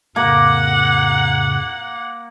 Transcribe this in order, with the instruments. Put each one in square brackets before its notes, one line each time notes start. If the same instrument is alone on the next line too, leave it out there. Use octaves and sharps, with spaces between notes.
[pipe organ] F2 A2 C#3 [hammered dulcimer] A#3 [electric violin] F#5